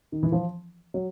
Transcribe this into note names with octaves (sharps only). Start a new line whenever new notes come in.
D#3
E3
F3
F#3